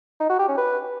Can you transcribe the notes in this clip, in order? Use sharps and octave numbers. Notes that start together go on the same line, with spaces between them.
D#4
F#4
G4
C#4
B4